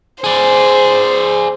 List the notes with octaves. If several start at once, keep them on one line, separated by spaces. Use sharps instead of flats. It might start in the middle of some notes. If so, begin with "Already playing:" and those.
G#4 C5 D5